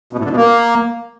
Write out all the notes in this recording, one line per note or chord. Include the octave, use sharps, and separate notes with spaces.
B2
A2
D3
B2
A#3